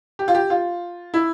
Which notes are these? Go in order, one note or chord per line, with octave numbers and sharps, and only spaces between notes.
G4
F4
G4
F4
E4